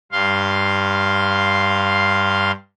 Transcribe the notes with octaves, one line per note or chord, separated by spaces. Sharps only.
G2 F5 C6